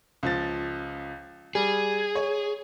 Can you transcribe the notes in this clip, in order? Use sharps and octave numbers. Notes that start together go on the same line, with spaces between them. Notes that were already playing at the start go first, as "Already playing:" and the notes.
C#2 F3 A6
G3 G#4
C#5